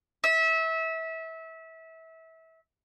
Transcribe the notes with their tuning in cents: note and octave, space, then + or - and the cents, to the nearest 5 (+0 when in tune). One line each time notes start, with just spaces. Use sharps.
E5 -25